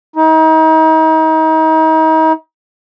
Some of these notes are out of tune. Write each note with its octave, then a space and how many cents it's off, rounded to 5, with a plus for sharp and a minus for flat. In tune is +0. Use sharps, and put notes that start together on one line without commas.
D#4 +35